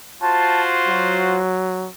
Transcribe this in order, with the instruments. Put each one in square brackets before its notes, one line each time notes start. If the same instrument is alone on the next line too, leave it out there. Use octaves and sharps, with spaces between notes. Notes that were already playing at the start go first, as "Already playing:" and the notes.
[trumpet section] F4 F#4 C5 [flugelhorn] A5
[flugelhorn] F#3